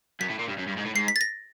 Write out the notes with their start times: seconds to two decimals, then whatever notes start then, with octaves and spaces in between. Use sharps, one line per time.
0.21 F#2 B6
0.30 A2
0.40 A#2
0.48 G2
0.58 F#2
0.68 G2
0.77 G#2
0.86 A2
0.95 G#2 C7
1.08 B6
1.16 A6
1.21 A#6